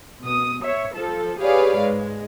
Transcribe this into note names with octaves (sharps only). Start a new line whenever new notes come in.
B2 D#6
C#5 E5
F3 A4
G4 G#4 B4 C#5 D5 F5
G#2 G#3